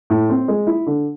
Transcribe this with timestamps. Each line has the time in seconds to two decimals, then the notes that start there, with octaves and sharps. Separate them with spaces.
0.10 A2
0.30 C4
0.48 G#3
0.67 E4
0.86 D3